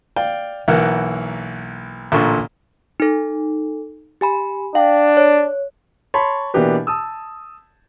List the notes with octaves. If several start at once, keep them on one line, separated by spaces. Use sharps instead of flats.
D5 F5 G5
B1 E3 A#3 A#4 F#5
A1 A#2 D3 A4 C6 C#6
D#4 A4
G4 G#5 B5
D4 F5 G5
C#5
C#5 A5 B5 C6
B2 E3 A#3 D4 G4 B4
A5 D#6 E6